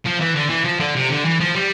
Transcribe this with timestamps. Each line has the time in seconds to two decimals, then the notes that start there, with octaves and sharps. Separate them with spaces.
0.05 F3
0.20 E3
0.35 D3
0.49 E3
0.64 F3
0.80 D3
0.95 C3
1.10 D3
1.25 E3
1.40 F3
1.55 G3